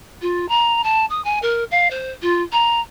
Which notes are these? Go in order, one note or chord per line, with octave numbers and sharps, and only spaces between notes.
F4
A#5
A5
D#6
G#5
A#4
F5
C5
F4
A#5